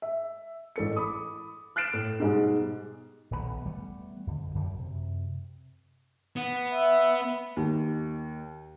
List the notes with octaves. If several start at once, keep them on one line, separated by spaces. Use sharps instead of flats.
E5
A1 A4 C#7
B5 D6 D#6
F6 F#6 A6 C7 D7 E7
A2
G#2 B2 G3 G#3
D#1 B1 C#3 B3
E3 G3 A3 B3
F2 D3
F#2 D3 F#3 G3
F#2 C3
B3
E5
D#2